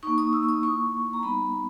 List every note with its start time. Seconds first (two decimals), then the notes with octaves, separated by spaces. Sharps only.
0.03 A#3 D#4 C#6
0.18 D#6
0.33 E6
0.43 C#6
0.49 D#6
0.63 A#3 E4 C#6
1.13 A#5
1.22 G3 B3 D#4 B5